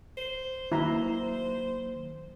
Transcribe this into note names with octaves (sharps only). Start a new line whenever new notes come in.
C5
D#3 F#3 A#3 E4 A#5